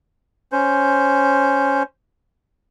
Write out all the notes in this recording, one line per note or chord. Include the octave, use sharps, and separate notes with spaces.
C#4 C5